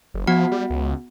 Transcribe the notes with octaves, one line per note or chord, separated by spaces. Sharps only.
F#1
F3 B3 F#4 F#5
G3
C#2